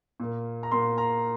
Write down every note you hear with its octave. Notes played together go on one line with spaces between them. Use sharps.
A#2 A#3
A#5
A#2 A#3 C6
A#5